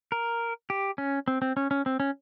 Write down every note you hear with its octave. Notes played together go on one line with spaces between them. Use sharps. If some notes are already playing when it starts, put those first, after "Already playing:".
A#4
G4
C#4
C4
C4
C#4
C#4
C4
C#4